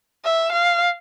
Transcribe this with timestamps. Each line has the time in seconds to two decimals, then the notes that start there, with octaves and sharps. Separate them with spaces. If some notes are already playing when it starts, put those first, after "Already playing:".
0.25 E5
0.52 F5